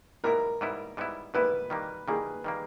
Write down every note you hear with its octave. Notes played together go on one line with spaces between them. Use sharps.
G#2 G3 B3 E4 A#4
G#2 G3 B3 E4
G#2 G3 B3 E4
G#2 G3 B3 E4 B4
D#3 G3 A#3
D#3 G3 A#3 G#4
D#3 G3 A#3